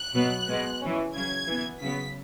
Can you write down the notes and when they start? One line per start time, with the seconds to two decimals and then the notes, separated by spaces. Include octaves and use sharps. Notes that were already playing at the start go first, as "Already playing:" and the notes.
Already playing: F#6
0.15 B2 F#3 B3
0.48 B2 G#3 B3
0.82 E3 C#4
1.14 C#3 F#3 C#4 G#6
1.48 E3 B3
1.81 C#3 F#3 B3 B6